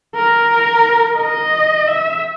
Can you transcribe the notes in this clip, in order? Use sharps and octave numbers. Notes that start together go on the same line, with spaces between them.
A#4
D#5
E5